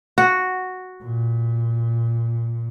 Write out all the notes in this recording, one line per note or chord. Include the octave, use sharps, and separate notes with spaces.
F#4
A#2